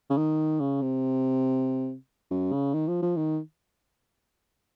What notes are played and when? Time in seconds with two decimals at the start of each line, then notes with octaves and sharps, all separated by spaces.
0.10 C#3
0.17 D#3
0.60 C#3
0.82 C3
2.31 F#2
2.52 C#3
2.74 D#3
2.88 F3
3.02 F3
3.17 D#3